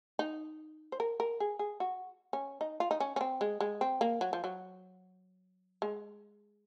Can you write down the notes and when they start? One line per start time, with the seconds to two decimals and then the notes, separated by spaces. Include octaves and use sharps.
0.19 D#4
0.92 C5
1.00 A#4
1.20 A#4
1.40 G#4
1.59 G#4
1.80 F#4
2.33 C#4
2.61 D#4
2.80 F4
2.91 D#4
3.00 C#4
3.16 C#4
3.21 C4
3.41 G#3
3.60 G#3
3.81 C4
4.01 A#3
4.21 F#3
4.33 F3
4.44 F#3
5.82 G#3